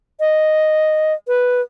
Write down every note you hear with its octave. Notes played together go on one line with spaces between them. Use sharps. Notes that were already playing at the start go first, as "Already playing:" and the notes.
D#5
B4